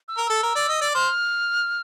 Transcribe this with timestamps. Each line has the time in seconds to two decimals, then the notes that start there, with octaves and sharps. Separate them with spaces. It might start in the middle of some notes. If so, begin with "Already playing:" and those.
0.08 E6
0.18 A#4
0.26 A4 E6
0.43 A#4
0.56 D5
0.69 D#5
0.81 D5
0.95 C5 F6